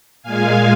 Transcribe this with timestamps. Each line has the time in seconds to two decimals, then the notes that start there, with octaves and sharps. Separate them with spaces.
0.22 A#2 G#3 F5 G#5